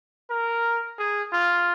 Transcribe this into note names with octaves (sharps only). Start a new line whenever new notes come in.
A#4
G#4
F4